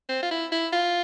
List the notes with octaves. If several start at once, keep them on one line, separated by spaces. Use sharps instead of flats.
C4
F4
E4
E4
F4